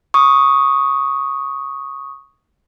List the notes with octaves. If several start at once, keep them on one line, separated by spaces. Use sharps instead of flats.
C#6 D#6